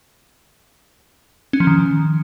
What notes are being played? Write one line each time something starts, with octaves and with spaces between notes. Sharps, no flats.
C#4
F3
D#3